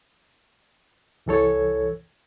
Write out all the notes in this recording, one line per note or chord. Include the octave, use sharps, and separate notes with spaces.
C2 E3 A4 C#5